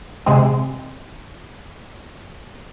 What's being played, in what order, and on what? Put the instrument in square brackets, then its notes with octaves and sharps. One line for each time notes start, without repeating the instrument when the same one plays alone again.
[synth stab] C3 G#3 C4